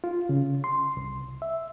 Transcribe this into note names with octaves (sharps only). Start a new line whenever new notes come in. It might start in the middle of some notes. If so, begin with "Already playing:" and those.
F4
C#3
C6
C2
E5